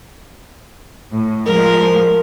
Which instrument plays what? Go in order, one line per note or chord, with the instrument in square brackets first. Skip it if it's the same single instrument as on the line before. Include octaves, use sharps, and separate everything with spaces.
[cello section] A2
[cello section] F3 G#3 [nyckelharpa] A#4